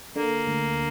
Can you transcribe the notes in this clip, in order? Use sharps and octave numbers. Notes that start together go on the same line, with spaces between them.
D3 A#3
D2